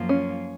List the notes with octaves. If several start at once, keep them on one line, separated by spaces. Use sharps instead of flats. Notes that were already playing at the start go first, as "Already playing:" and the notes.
Already playing: F#2 F3 A#3 F4
C#4